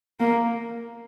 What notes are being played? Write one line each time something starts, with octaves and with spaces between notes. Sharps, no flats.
A#3